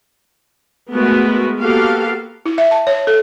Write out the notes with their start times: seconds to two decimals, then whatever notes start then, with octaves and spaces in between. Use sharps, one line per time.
0.92 G#3 A3 B3 F#4 A#4 B4
1.62 A#3 B3 F#4 G4 A4 F5
2.46 E4
2.58 E5
2.71 A5
2.87 C#5
3.07 A4